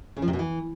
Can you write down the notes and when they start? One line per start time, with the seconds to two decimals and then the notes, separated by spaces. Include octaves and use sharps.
0.16 C#3
0.22 F3
0.28 C3
0.33 B2
0.39 E3